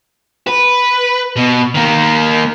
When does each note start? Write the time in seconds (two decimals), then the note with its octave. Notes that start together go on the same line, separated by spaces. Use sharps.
0.47 B4
1.36 B2
1.75 D#3 A#3